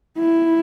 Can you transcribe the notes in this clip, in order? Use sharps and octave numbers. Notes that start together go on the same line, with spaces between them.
E4